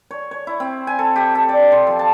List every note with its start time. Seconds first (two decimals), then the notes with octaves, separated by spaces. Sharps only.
0.11 C#5
0.31 C#5
0.47 E4
0.60 C4
0.87 G#5
0.99 A4
1.16 G4
1.35 A4
1.49 D5
1.72 C6
1.87 F3
1.99 A5